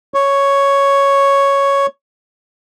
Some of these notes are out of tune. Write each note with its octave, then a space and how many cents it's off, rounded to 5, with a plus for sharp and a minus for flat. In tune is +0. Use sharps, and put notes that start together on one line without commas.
C#5 +0